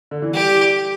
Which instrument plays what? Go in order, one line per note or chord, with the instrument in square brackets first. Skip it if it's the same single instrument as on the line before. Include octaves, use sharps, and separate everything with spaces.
[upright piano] D3
E3
[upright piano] G3 [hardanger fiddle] G4